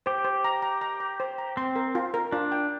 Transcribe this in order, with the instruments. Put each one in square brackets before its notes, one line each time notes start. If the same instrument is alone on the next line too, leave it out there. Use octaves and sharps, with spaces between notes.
[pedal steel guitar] G4 [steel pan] C5
[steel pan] C5
A#5
A#5
A#5
A#5
C5
A#5
[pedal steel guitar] C4 [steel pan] C6
[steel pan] A#4
F4
A#4
[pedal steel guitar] D4 [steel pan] F4
[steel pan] G5